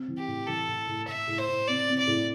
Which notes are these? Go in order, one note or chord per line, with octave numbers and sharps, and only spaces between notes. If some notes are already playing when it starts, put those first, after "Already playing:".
Already playing: C4
E3
G4
A2
E3 A4
A2
A2
A2 E5
A2
C5
A2
C4 D5
C4
D5
A2